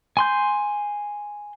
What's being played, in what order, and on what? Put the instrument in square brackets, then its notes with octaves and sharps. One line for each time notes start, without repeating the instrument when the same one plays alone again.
[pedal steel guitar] G#5 C6 G6